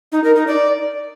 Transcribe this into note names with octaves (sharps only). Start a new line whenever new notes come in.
D#4
A#4
D#4
D5